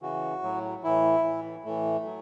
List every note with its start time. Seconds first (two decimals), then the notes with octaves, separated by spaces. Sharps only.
0.02 C#3 E3 F#4
0.43 A2 F#3
0.83 A2 E3 E4
1.24 A2 E3
1.64 A2 E3 A3
2.05 F#3